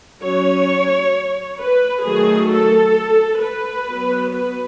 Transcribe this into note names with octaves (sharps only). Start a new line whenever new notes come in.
F#3 C#4 C#5
B4
D#3 F#3 A3 G#4
A4
B4
F#3 B3
B4